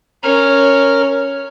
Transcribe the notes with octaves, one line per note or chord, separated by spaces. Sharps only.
C#4 A#4 F6